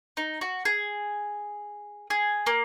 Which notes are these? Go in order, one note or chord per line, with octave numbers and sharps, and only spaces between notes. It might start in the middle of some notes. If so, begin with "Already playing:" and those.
D#4
F#4
G#4
G#4
A#3